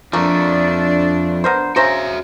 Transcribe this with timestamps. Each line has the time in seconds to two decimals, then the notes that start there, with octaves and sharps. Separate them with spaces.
0.13 F2 F3 A3 A#3 D4
1.44 B3 A#4 C5
1.76 C#3 F#4 C5 E5 A#5